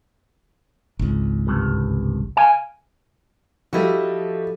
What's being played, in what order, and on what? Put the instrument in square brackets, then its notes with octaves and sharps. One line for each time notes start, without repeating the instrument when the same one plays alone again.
[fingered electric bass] G#1 C#2
[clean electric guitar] C2 G2
F5 G#5
[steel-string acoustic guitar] F3 A4 D#5 [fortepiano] G3 E4 F#4